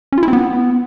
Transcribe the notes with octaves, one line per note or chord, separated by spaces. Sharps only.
C#4
F4
E4
C4
B3